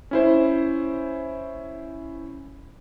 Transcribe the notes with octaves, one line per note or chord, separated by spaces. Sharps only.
C#4 E4 C5